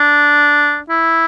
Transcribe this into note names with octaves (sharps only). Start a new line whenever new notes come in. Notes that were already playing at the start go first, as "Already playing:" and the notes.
Already playing: D4
E4